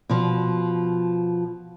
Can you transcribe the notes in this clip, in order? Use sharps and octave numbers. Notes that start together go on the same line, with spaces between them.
B2 F3